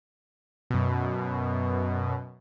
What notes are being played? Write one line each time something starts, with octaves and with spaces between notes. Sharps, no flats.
F#2 B2